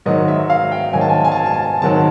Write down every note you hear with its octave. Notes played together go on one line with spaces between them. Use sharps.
G#2 D#3 F#3 D#5
E5
F5
G5
G#2 D#3 F#3 G#5
A5
G#5
A5
G#5
A5
G#5
A5
G#5
G#2 D#3 F#3 A5